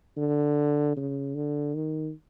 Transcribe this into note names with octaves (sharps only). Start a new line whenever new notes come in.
D3
C#3
D3
D#3